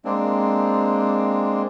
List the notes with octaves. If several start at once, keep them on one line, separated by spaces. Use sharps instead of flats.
G#3 A#3 C4 D4